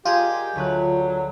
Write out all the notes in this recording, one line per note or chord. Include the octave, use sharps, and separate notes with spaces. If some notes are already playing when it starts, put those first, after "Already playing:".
F4 G4 G#4 A#4 D#5
D2 F#3 B4 F#6